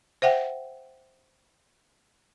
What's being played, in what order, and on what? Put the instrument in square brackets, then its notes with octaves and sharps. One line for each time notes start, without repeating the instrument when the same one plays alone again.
[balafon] C5 E5 F#5 G5